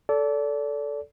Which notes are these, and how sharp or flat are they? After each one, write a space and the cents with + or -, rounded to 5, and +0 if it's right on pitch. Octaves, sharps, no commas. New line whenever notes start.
A4 -5 D5 -30